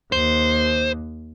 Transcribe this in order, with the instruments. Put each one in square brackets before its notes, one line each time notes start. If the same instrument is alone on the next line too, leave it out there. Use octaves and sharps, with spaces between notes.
[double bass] D#2 [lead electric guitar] C5